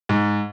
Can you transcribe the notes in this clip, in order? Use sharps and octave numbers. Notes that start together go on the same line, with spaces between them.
G#2